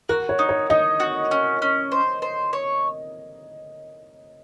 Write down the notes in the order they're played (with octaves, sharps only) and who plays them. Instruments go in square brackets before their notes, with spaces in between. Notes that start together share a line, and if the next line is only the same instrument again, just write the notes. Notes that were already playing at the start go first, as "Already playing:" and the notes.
[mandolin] F#4 [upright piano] A#4
[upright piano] C#5
[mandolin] D#4
[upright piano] C#5
[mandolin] D#4 [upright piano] D#5
[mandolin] F#4
C#4
C#4
C5
C5
C#5